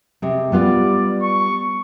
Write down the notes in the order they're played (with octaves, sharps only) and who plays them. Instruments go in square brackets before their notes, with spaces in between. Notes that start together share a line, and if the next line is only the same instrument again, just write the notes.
[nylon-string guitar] C3 G#3
[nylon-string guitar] G3 B3 F4 [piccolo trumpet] D5
[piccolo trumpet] C#6